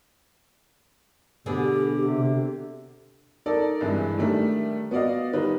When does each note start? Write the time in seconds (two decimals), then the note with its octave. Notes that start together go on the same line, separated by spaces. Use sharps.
1.46 B2 D3 B3 G4 G#4
1.98 C3
3.46 D#4 A4 A#4 D5
3.81 G2 C3 E3 G#3
4.18 D#3 G3 A3 D4
4.91 B3 F#4 D5 D#5 F5
5.33 D#3 G3 D#4 B4